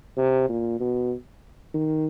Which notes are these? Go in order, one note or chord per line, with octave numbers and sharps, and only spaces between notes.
C3
A#2
B2
D#3